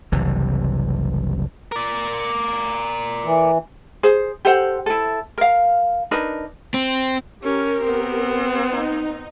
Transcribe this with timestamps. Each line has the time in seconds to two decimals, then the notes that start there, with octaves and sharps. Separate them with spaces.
0.12 F#1 C2 C3 E3
1.72 A#4 D5
3.25 E3
4.03 G#4 C5
4.45 G4 A4 C5 F#5
4.86 E4 A4
5.38 A#4 F5
6.11 D4 D#4 A#4 B4
6.74 C4
7.43 C#4 G4 A#4
7.84 B3 C4
8.71 D#4